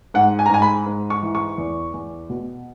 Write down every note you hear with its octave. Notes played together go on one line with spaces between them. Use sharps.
G#2 F#5
G#5
A#5
G#2 G#5
B5
G#2
C#6
E3
C#6
E2
E2
B2